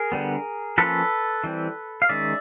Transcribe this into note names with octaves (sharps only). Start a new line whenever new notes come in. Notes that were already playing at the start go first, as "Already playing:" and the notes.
Already playing: G#4 A#4
D3 G3 B3
F3 A#3 C#4 A4 B4
E3 G3 C4
F5
D#3 G#3 C#4 D5 E5